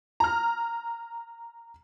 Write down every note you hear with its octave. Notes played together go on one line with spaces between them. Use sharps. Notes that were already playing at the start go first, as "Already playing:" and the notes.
A#5 F6